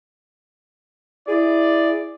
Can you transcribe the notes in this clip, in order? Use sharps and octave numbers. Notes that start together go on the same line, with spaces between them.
E4 G#4 D5